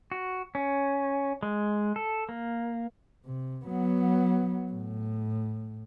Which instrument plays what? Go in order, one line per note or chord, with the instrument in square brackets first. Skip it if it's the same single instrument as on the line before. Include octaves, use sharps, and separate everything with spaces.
[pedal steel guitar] F#4
C#4
G#3
A4
A#3
[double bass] C3
F#3 B3
A2